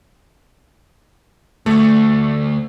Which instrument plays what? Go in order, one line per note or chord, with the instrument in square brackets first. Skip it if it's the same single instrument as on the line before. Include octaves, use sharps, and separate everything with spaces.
[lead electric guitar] D2 [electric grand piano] A3